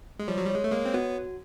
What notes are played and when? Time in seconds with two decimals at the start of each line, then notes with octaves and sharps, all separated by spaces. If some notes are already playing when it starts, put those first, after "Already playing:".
0.19 G#3
0.28 F3 G3 C#5
0.37 F#3
0.46 G3 C#5
0.55 G#3
0.64 A3
0.71 G#3 A#3 C#5
0.85 C4
0.94 B3 F#4